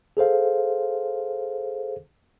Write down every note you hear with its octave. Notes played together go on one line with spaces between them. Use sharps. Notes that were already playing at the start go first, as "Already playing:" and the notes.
G#4 A4 C5 F5